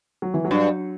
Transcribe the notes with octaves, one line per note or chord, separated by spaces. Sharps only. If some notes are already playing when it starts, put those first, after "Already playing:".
F#3
E3
F#3
G2